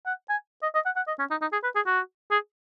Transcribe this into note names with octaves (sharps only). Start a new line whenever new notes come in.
F#5
G#5
D#5
D#5
F#5
F#5
D#5
C#4
D#4
D#4
G#4
B4
G#4
F#4
G#4